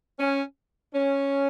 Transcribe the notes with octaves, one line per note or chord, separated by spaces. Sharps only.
C#4
C#4